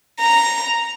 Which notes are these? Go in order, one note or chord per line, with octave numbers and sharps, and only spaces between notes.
A#5